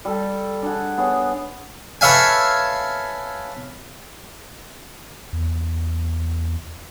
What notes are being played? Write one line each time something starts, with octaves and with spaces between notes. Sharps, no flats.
G3 A4
D4 G#4 F#5
B3 G#4 C#5
A4 B4 C#5 E5 F5 G#5
E2